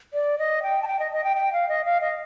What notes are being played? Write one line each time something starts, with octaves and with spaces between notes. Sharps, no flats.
D5
D#5
G5
A5
G5
D#5
D#5
G5
G5
F5
D#5
F5
D#5